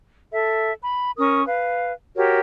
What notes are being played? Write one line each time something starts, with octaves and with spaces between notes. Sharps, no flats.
A4 E5
B5
C#4 A#4 C#6 D#6
B4 F5
F#4 G4 A#4 C#5